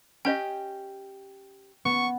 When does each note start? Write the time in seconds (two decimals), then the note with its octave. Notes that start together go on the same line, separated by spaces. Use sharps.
0.25 C#4 G4 D#5 G5
1.85 B3 C#6